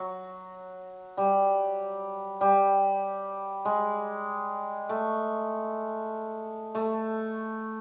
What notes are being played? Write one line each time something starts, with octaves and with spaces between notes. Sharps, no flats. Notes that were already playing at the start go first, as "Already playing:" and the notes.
Already playing: F#3
G3
G3
G#3
A3
A3